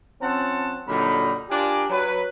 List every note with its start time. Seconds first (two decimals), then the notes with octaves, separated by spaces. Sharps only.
0.21 F3 C4 C#4 F#5 A5
0.87 A#2 D3 F#3 G3 D#4 B5
1.50 D4 F4 G4 A#4 D5 G#5
1.90 F#3 B4